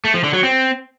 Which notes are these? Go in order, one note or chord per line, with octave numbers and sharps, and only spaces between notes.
A3
F3
D3
F#3
C4